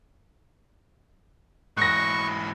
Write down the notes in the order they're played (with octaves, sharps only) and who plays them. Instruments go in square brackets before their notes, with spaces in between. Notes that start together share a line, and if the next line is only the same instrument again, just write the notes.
[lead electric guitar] G#2 E3 [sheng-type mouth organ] C#6 [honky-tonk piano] F#6 A#6